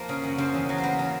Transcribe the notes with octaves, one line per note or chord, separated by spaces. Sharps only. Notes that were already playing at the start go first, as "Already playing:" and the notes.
Already playing: F3 A#3 C5
C#3
F#2
C#3 C5
E2
F#3
C5
A#3 B4
C#3